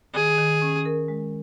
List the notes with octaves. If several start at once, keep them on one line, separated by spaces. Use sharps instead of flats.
D#3 G#4
D#3
C#4
A#4
G#3